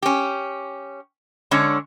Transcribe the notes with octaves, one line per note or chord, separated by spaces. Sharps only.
C#4 G4
D3 G#3 C#4 D4 C#5